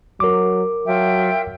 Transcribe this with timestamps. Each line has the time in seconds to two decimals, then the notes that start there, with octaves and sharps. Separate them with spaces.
0.20 F#3 A#4 D6
0.86 F#3 F4 E5 G5